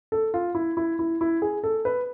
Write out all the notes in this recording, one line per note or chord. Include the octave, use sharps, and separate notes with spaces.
A4
F4
E4
E4
E4
E4
G#4
A4
B4